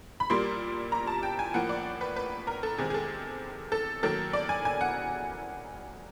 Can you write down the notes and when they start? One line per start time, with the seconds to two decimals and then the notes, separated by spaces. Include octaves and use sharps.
0.20 B5
0.30 A#2 G3 A#3 C6
0.92 A#5
1.07 A5
1.23 G5
1.39 G#5
1.54 A2 F3 A#3 F#5
1.69 D5
2.01 B4
2.16 B4
2.47 A#4
2.63 A4
2.78 C3 D#3 G#3 C4 G#4
2.90 G#4
2.94 A4
3.72 A4
4.03 D#3 F#3 A#3 A4
4.33 D5
4.49 G#5
4.65 G#5
4.81 F#5